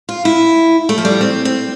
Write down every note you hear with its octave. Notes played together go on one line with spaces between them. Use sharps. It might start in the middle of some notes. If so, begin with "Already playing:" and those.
F4
E4
A3
F3
G3
C4
C4